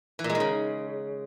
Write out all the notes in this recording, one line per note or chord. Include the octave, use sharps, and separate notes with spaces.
E3
A#2
G#3
D#3
C#3